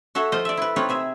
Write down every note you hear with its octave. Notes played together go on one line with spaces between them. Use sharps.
F#4 A4 C#5 E5 F#5
F3 F4 C5 D#5
D5 E5
E4 B4
C4 D#4 F4 B4 C#5
C3 G#4 E5